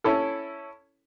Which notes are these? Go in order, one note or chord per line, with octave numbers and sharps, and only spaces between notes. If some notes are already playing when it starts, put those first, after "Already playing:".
C#4 E4 A4